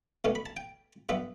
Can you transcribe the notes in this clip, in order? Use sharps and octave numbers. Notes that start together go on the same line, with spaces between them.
C#2 B2 A3 C#4
B5
A5
G5
G2 F#3 B3 E5